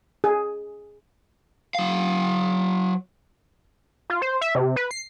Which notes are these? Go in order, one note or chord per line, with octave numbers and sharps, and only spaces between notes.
G#4
F#3 F5
F4
C5
E5
C3
B4
C7